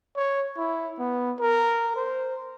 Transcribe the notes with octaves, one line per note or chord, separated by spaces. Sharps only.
C#5
E4
B3
A#4
C5